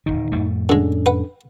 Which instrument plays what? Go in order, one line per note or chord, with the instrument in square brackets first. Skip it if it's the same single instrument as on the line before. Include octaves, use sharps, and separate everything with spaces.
[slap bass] D1 G1 D#3 [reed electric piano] D#4
[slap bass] F2 A2 A3
[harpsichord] D3 G#3 [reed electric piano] C#4 D4 A4
[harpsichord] B4 F#5